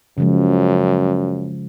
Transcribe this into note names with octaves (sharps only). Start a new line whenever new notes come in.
F#2 C#3 F3 G#3